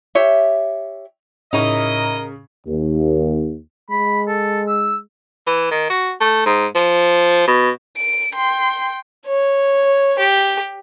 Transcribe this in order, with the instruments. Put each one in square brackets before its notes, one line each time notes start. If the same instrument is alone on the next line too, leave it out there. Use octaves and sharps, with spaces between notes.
[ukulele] G4 C#5 E5
[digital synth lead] A2 [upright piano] C#3 C#6 [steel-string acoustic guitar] D#4 E4 [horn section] A#4 D#5
[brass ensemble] D#2
[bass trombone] G#3 [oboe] B5
[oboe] A4
E6
[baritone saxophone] E3
D#3
F#4
A3
G#2
F3
B2
[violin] D7
G5 C6
[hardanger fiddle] C#5
G4